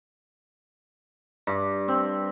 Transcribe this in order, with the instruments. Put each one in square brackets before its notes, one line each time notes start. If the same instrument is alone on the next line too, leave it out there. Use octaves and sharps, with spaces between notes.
[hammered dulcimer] G2
C4